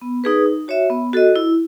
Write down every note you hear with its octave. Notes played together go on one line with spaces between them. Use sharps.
B3
D#4 G#4 B4
D#4
F#4 C#5 E5
B3
F#4 A4 D#5
E4